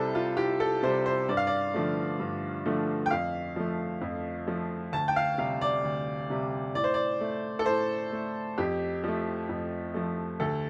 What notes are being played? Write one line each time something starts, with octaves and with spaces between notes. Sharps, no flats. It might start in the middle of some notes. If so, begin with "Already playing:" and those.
Already playing: C2 C3 G3 A4 C5
F4
C2 G4
A4
C3 G3 C5
C5
G2 D5
F5
D5
D3 F3 A3
G2
D3 F3 A3
G5
F2 F5
F3 A3
F2
F3 A3
D2 A5
G5
F5
C3 G3 F5
D5
D2
C3 G3
A2 D5
C5
D5
A3
A4
A2 C5
A3
F2 G4
F3 A3
F2
F3 A3
D2 A4